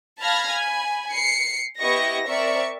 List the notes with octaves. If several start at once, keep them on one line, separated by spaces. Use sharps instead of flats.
F5 A5 B5 F6 G#6 A#6
G#5 B5
C7 C#7
B3 E4 G4 D#5 C#6 A#6
C4 A#4 D5 E5 C#6